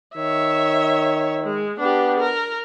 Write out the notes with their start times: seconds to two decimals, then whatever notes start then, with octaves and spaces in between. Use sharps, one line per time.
0.16 D#3 C#5 E5
1.44 G#3
1.79 B3 D4 G4
2.20 A#4